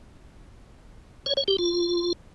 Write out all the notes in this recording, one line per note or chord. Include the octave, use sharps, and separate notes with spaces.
C#5
C#5
G4
F4